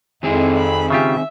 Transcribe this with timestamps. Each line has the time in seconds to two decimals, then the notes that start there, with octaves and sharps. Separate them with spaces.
0.23 F2 D#3 G#3 C4 E4 G#4
0.58 B5
0.91 C#3 F4 G4 E5